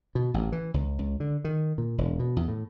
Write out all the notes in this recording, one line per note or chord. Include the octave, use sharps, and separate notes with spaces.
B2
A1
E3
C#2
C#2
D3
D#3
A#2
E1
B2
E2
A2